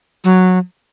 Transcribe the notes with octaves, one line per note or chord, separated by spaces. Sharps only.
F#3